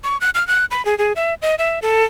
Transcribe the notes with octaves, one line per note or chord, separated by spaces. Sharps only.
C#6
F#6
F6
F#6
B5
G#4
G#4
E5
D#5
E5
A4